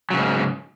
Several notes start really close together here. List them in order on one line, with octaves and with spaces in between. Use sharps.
F#3 C#3 G#2